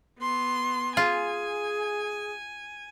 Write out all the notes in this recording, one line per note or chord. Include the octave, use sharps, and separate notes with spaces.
B3 C6
F4 G#4 G#5